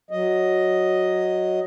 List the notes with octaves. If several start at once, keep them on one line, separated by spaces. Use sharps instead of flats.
F#3 D#5